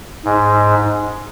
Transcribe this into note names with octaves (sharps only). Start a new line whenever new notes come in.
G#2